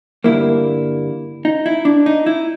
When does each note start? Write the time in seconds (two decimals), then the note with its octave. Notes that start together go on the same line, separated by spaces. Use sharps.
0.24 G2 D3 G3 A#3 E4
1.45 D#4
1.66 E4
1.85 D4
2.06 D#4
2.26 E4